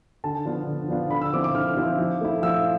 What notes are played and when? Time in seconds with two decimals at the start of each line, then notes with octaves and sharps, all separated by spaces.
0.24 D3 A5
0.45 F3 B3 D4 F4
0.67 D3
0.88 F3 B3 D4 F4
1.11 D3 B5
1.21 E6
1.33 F3 C4 E4 D6
1.44 D6
1.55 D3 F6
1.77 F3 C4 E4
1.99 F3
2.21 A3 E4
2.43 F3 E6